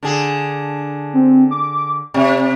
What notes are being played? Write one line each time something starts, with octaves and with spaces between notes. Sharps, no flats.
D3 G#4
C4
D6
C3 D5